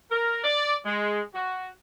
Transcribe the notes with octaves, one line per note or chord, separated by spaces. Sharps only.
A#4
D5
G#3
F#4